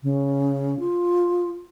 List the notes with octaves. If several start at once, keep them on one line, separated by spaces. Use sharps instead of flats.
C#3
F4